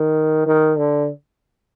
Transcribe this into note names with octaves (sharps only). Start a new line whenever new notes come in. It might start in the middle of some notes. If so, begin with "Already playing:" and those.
Already playing: D#3
D#3
D3